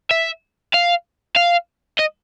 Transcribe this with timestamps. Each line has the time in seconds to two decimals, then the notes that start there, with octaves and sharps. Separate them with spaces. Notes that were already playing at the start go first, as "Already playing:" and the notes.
0.11 E5
0.74 F5
1.36 F5
1.99 D#5